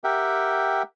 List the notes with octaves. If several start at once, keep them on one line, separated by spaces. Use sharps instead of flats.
G4 A#4 E5 F#5 G5